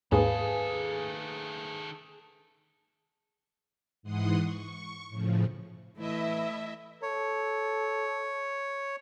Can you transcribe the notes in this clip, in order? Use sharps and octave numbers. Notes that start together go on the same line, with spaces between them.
D#2 G#2 D#3 G#4 A4 B4 F5 A5
G#2 E3 F#5 C6 D#6
C#6
A2 C#3 F3
E3 A3 E4 D#5 E5
A4 C#5